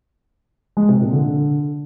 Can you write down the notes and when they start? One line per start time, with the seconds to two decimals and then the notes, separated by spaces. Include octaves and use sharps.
0.77 G#3
0.89 C3
1.01 A#2
1.13 D3